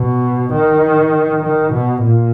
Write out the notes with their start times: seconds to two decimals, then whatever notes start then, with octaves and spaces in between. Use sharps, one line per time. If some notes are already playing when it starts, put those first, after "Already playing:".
Already playing: B2
0.53 D#3
1.43 D#3
1.73 B2
2.03 A#2